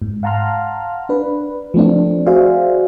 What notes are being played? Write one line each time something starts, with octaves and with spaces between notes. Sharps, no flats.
G#2
F5 F#5 A5 A#5 C6 F6
D4 B4
F3 A3 C4 D4
F#4 G#4 C5 D5 E5 F5